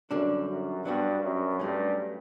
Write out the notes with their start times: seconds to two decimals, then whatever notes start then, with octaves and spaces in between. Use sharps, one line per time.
0.11 F#2 D3 G3 D4
0.48 F#2
0.85 G2 F#3 B3 D4 F#4
1.23 F#2
1.60 G2 F#3 A3 C#4